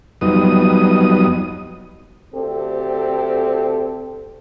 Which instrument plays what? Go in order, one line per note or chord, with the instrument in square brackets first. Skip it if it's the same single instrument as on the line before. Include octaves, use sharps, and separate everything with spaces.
[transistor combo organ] F2 F#3 G3 B3 D#4 D#6
[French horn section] D2 C4 G4 A4